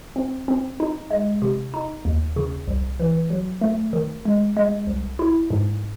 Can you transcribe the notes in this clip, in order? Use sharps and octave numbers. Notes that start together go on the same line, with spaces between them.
C4
C4
D#4
G#3
C3
D#4
D#2
C#3
C2
E3
F#3
A3
D#3
G#3
G#3
C2
E4
G#2